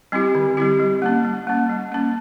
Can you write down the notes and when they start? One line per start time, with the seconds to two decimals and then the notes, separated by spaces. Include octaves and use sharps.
0.12 G3 C4 E4 G4
0.35 D3
0.57 G3 C4 E4 G4
0.80 G3
1.02 A#3 C#4
1.25 G3
1.47 A#3 C#4
1.70 G3
1.92 A#3 C#4